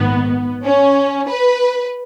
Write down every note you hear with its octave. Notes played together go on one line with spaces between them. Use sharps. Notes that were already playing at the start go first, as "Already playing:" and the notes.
Already playing: A#1 G#2 D#3 B3
C#4
B4